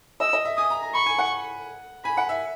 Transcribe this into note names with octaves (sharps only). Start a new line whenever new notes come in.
D#5 E6
D#5
E5
G#5 D#6
A#5
A#5
B5 C#6
G#5
F#5
G#5 B5
F#5
E5